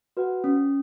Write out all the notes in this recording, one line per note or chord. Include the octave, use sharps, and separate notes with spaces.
F#4 B4 F#5
C#4